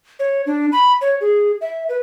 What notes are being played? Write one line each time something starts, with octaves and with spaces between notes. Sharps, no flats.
C#5
D4
B5
C#5
G#4
E5
B4